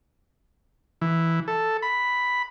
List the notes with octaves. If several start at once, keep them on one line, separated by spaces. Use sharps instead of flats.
E3
A4
B5